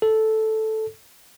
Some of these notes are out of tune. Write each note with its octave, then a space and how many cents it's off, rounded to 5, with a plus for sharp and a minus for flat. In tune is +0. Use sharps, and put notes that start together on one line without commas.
A4 -5